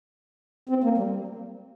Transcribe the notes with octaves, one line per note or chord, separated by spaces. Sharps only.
C4
A#3
G3